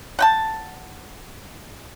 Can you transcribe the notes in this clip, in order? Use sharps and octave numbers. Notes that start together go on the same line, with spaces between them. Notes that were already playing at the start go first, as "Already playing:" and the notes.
F#5 G5 A5